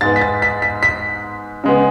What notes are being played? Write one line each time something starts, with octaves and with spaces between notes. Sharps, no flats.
G#2 G#3 B3 A6
B6
A6
B6
B6
B6
C#3 G#3 B3